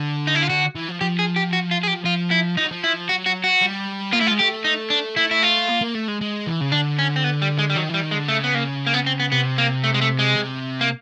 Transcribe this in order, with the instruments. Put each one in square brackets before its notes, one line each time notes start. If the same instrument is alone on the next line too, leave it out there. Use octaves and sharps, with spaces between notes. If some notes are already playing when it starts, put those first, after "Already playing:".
Already playing: [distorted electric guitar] D3
[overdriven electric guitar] D#4
E4
F4
[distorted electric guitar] D3 [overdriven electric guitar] F#4
[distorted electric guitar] E3
F3
[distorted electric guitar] F3 [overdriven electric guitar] G4
[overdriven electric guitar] G#4
G4
F#4
F4
G#4
G4
[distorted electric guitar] F3 [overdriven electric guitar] F4
[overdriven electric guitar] E4
[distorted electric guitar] F3 [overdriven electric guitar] D#4
[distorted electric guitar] F#3
F3
[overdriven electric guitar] E4
[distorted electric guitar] F#3 [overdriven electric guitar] F#4
[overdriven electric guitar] F#4
F#4
[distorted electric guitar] G3
[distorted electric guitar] A#3 [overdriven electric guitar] F4
[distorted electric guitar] A3 [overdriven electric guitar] E4
[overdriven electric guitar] F4
[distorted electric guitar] G#3
[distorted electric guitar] A3 [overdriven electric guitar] G4
[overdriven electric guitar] D#4
D4
[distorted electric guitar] A3 [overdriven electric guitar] E4
[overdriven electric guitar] E4
F4
[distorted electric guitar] A#3
A#3
A3
G#3
G#3
E3
C#3
[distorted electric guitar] D3 [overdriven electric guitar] D4
[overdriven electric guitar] C#4
C4
B3
G3
G#3
G3
[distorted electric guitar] D#3 [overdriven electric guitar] F#3
[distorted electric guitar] E3 [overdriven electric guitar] G3
[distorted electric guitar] D#3
[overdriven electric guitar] G#3
[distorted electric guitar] D3
[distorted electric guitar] C#3 [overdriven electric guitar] A3
[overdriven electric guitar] B3
A#3
A#3
B3
C4
B3
[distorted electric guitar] C3 [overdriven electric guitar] B3
[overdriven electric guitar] A#3
A3
G#3
A3
G#3
[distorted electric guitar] C3
[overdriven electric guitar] A#3